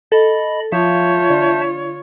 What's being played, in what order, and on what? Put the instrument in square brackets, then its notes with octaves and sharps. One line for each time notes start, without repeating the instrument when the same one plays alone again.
[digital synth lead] A4 [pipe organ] D#5 B5
[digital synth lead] F3 [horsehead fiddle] F4 C#5 [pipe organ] E5 A5 G6
[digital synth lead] D3